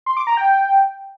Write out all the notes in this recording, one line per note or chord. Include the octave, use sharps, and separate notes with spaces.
C6
D6
A#5
G5